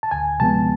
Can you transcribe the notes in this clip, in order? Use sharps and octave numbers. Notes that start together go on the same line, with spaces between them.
A5
D2 G#5
C3 F3 G#3 B3 A5